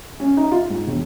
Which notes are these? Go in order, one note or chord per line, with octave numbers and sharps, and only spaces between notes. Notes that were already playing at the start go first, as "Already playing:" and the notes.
C#4
D#4
F4
G#2
E1